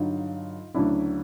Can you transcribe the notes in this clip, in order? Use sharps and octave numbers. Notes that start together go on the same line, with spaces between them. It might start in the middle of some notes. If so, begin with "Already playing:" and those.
Already playing: G2 D3 F#3 D#4 F4
D2 C#3 F#3 D4 E4